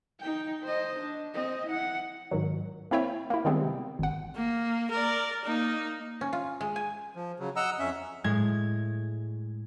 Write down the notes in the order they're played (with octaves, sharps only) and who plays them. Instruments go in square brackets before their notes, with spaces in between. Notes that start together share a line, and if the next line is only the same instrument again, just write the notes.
[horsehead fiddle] D#4 G5
C5 D#5
D4
C4 D#5
E4 F#5
[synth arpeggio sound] G#2 D#3 F#3
A#3 C4 E4 C#5 E5 G5
A#3 E4
D#3 G3 G#3 B3 C4
C3
G#1 F#5
[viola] A#3
A#4 D5
A#3 D#4
[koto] C#4
F4
G#3
G#5
[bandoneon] F3
C#3 F#3
D#5 F#5 A#5 E6
F2 C#4 E5
[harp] A2 G#3 G#6